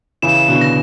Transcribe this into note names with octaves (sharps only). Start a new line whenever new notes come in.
C#3 E3 E7
B2 D3
A#6